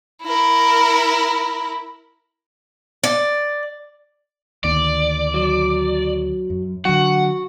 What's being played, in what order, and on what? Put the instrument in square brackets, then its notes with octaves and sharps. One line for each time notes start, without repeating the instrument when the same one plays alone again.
[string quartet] E4 A#4
[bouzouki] D5
[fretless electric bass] D2 D#3 A#3 [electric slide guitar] D5
[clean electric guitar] F#3
[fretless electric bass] F#2
[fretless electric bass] D3 F#3 [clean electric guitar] F#4 [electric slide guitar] F#5